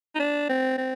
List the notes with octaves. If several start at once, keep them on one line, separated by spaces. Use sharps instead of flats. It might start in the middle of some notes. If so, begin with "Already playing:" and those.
D#4
D4
C4
C4